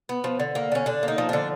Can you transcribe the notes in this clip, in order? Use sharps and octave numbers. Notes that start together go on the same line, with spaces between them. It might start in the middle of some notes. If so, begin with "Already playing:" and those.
B3
F3
D3
A#3
D3 C#4
D3 D4
A#3
D#4
F3
D3 D4